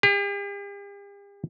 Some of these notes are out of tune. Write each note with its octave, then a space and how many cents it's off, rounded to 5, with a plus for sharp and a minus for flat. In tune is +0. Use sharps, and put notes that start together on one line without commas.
G4 +45